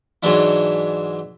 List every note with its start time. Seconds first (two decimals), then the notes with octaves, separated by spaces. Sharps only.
0.23 G#2 E3 F#3 G#3 D4 E4